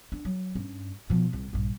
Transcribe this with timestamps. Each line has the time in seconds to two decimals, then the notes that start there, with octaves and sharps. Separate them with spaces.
0.12 D4
0.25 F#3
0.55 G2 C#4
1.10 B2 F3
1.33 C2
1.53 A#1 G2